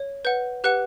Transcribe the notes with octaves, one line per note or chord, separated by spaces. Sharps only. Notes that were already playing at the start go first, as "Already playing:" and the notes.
Already playing: C#5
B4 F#5 G6
G4 B4 F#5 F#6